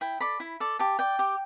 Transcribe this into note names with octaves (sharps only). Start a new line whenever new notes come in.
E4 G5
A4 D5 B5
E4
A4 D5
G4 A5
D5 G5
G4